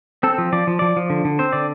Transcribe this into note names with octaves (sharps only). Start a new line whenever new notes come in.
C4 A4
F3
F3 D5
F3
F3 D5
F3
D3
D3
C4 C5
D3 D5